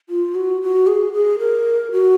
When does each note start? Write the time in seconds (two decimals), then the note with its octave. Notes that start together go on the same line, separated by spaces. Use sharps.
0.09 F4
0.35 F#4
0.62 F#4
0.87 G#4
1.13 G#4
1.39 A#4
1.92 F#4